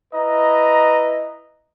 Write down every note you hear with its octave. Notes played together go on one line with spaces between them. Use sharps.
E4 B4 D#5 A#5